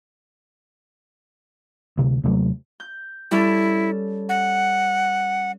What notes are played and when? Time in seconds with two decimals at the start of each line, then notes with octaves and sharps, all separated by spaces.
1.98 D2 C3
2.24 D#2 C3 F#3 A3
2.80 G6
3.31 G3 C#4 E4 A4
4.29 F#5